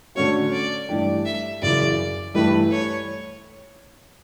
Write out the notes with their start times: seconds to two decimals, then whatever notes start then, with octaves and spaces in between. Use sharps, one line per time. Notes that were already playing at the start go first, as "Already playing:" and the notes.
0.15 D3 A3 C#4 F#4 C#5
0.52 D5
0.89 G2 E3 A3 D4 G4
1.25 E5
1.62 F#2 C#3 E3 D5
2.34 G2 E3 A3 E4 G4 B4
2.71 C#5